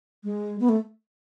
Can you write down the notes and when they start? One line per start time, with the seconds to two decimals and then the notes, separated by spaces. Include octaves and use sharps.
0.24 G#3
0.60 B3
0.69 A3